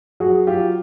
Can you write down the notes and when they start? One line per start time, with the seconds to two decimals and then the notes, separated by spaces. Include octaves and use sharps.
0.20 F#3 F#4 G#4
0.47 F#3 F4 G4